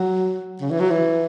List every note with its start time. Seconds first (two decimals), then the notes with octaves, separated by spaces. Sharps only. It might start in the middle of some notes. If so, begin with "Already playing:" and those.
Already playing: F#3
0.61 C#3
0.71 E3
0.80 F#3
0.90 E3